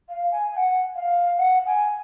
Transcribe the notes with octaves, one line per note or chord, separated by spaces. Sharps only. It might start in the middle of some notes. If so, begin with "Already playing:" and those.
F5
G#5
G#5
F#5
F5
F#5
G#5